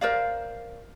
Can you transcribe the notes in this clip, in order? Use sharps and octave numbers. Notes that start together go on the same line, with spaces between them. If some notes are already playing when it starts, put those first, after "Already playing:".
A#4 C5 D5 F5